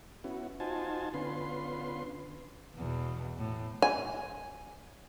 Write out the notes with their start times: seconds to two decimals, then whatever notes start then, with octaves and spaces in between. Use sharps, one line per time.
0.24 B3 C#4 E4 F#4
0.60 D#4 F4 F#4 C5 G#5 A5
1.14 D3 B3 C#4 F4 B4 C6
2.76 E2 B2
3.38 A2
3.82 G#5